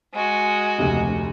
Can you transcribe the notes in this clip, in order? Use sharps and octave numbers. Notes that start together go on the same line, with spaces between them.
G#3 F#4
F1 D2 C3